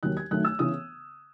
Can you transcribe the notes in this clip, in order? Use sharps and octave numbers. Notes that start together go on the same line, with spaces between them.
D#2 D#3 F#3 F#6
G#6
F#2 D#3 F#3 A3 F#6
E6
C#3 E3 B3 D#6